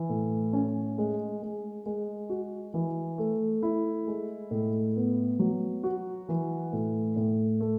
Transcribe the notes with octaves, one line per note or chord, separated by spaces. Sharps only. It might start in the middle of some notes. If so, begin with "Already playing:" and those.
Already playing: E3
A2
C#4
G#3
G#3
G#3
F#4
E3
A3
E4
G#3
A2
B3
F#3
F#4
E3
A2
A2
A3